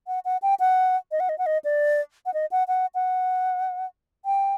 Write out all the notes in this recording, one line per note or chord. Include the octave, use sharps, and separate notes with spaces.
F#5
F#5
G5
F#5
D#5
F#5
D#5
F#5
D#5
D5
F#5
D#5
F#5
F#5
F#5
G5